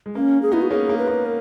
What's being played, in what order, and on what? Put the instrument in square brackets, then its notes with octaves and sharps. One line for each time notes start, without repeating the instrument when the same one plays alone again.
[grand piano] G#3
[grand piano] A#3 [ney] C#4
[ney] G#4
[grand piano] B3 D#4 [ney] E4
[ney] F#4
[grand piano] A#3 C#4 [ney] G#4
[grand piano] A#3 C#4
[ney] B4
[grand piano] A#3
[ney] A#4